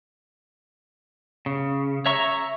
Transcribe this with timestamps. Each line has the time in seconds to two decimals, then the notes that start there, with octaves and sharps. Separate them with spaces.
1.46 C#3
2.06 C#5 E5 A#5 C#6